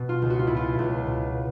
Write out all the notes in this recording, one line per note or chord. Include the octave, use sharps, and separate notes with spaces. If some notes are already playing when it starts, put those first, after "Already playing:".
Already playing: B2
F4
C#2
F#4
F4
B2 E4
F4
C#2
B2